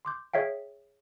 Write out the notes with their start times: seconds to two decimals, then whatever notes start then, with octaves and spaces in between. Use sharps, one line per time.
0.05 C6 D6 G6
0.34 G#4 C#5 E5 F5 G5